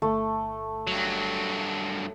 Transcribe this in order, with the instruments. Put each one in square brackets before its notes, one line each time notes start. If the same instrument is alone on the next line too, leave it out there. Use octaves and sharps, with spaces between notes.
[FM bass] G1 [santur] A3
[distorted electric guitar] G2 F#3